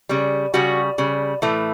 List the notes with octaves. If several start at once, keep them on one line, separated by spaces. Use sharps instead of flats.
C#3 G3
C#3 G3 F#4
C#3 G3
A2 E3 A3